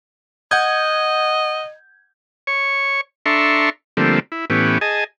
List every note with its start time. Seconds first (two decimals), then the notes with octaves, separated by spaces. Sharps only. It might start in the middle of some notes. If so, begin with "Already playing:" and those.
0.51 D#5 F#5 G6 G#6
2.47 C#5 C#6
3.26 D4 A4 E5 A#5 C6 C#6
3.97 D3 F3 G3 A3 A#3 C4
4.32 E4
4.50 A2 E3 B3 C#4 G4
4.81 G#4 D#5 G#5 A5